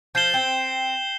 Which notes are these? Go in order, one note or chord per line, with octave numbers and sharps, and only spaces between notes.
F3 G6 C7 E7 G7
C4